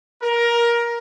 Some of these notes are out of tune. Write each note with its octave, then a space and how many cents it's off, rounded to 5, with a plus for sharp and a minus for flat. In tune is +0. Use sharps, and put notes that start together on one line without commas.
A#4 +15